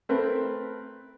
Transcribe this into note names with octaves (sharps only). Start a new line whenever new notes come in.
A3 C4 A#4 B4